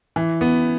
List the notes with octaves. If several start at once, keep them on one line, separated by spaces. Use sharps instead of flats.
E3
B3